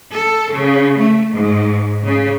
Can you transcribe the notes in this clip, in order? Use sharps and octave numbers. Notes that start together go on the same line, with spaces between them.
A4
C#3
A3
G#2
C#3